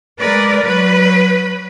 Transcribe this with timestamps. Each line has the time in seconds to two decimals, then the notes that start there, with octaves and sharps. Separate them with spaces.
0.19 G#3 A#4 B4 D5
0.64 F#3 B4